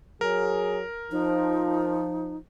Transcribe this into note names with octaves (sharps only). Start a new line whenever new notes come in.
F#3 G#4 A#4
F3 D#4